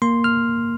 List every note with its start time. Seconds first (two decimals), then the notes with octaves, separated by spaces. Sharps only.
0.02 A#3 C6
0.24 F6